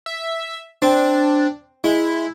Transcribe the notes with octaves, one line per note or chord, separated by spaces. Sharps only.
E5
C4 D4
G#3 E4